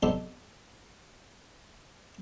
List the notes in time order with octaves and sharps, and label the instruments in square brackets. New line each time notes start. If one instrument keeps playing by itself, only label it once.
[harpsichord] B3 C4 D#4 G4 A4